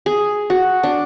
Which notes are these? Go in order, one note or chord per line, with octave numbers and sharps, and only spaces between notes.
G#4
F#4
D4